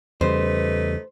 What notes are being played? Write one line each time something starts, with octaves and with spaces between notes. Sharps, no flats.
E2 C#3 G3 A3 D#4 B4 C5